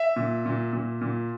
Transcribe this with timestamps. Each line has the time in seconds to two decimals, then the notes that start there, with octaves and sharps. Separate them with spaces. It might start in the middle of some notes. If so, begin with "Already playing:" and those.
Already playing: E5
0.16 A#2
0.46 A#2
0.73 A#2
1.01 A#2